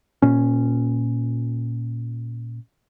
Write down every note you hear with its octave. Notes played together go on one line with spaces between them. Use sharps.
A#2 C#4